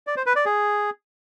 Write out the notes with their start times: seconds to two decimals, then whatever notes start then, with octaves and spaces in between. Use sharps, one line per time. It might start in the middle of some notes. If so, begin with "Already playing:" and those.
0.07 D5
0.17 C5
0.26 B4
0.36 D5
0.46 G#4